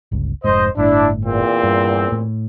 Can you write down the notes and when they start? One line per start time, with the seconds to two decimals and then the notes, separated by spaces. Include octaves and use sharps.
0.12 G1 C#2
0.44 F1 G#2 C5 D#5
0.77 G1 A2 D4 E4
1.25 E2 A#2 C4
1.64 G2
2.12 A2